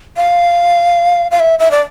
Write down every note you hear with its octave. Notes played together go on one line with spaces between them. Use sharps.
F5
F5
E5
E5
D5